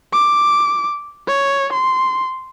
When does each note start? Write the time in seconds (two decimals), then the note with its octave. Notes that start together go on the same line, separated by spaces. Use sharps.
0.13 D6
1.27 C#5
1.72 C6